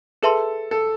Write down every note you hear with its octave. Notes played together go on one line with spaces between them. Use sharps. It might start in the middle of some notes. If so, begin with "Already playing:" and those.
G#4 A4 B4 E5 A5 C6
A4